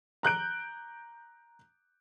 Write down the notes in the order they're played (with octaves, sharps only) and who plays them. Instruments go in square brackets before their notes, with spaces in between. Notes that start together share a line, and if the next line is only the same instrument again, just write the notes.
[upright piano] A#5 F#6 G6 D7